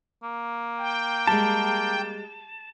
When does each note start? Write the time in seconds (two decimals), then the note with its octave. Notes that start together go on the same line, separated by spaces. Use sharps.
0.23 A#3
0.78 G5
1.27 G3 G#3 A5